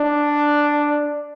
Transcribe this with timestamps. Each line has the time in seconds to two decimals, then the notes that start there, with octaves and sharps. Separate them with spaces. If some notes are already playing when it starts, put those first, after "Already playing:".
Already playing: D4